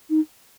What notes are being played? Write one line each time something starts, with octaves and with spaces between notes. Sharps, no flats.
D#4